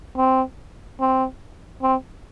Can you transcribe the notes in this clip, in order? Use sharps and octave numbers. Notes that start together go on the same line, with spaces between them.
C4
C4
C4